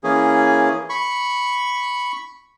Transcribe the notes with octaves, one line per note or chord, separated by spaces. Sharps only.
E3 A#3 C#4 G#4
B5 C#6